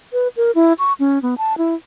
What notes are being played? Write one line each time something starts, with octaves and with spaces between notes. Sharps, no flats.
B4
A#4
E4
C#6
C#4
B3
A5
E4